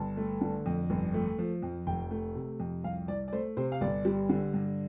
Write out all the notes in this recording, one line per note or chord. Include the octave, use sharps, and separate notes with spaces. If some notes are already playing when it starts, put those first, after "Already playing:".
Already playing: G1 A5
A3
D3
F2
G1
A3
F3
F2
F1 G5
A3
C3
F2
C2 F5
C2 D5
D5
A3 C5
C3 C5
F5
G1 D5
G3
D3
G2